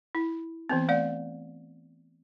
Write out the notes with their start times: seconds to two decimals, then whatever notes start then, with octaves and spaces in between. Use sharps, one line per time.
0.15 E4
0.69 E3 B3 C4
0.89 A3 D5 F#5